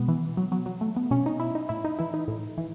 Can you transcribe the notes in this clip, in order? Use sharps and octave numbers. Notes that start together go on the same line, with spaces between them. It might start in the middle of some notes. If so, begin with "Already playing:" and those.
Already playing: B2 G#3 B3
E3
F#3
B2 F#3
F#3
A3
B3
B2 C#4
D#4
E4
D#4
A2 E4
D#4
E3 E4
D#4
A2
E3